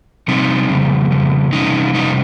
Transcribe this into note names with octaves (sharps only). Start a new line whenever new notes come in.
C3 G3 C4 D#4
F2 C#3 G3
F2 C#3 G3
F2 C3 G3 C#4 D#4
F2 C3 G3 C#4 D#4